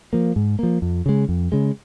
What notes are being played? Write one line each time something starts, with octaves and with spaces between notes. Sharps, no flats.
F3 A#3
G#2
F3 A#3
F2
C#3 G#3
F2
C#3 G#3